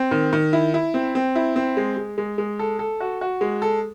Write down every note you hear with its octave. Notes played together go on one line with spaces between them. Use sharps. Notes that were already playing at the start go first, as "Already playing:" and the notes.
Already playing: C4
D#3
D#3
E4
E4
C4
C4
E4
C4
G#3
G#3
G#3
G#3
A4
A4
F#4
F#4
G#3
A4